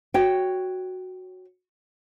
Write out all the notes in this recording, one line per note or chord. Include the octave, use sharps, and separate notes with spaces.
F#4 C#5 G5